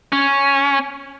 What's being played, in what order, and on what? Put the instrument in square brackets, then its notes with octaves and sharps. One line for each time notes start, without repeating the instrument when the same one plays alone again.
[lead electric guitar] C#4